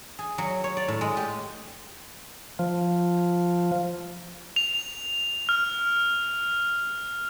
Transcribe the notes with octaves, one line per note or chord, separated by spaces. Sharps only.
G#4
F#3
C#5
D5
A2
G#3
G4
F3
F7
F6